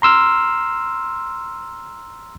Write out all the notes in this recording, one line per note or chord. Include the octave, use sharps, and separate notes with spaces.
A#5 C6 E6 F6